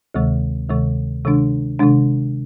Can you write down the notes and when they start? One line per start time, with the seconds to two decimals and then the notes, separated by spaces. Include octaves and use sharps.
0.15 D2 C3 D#3 G#3
0.70 D2 C3 D#3 G#3
1.25 C3 D#3 G#3 D4
1.79 C3 D#3 G#3 D4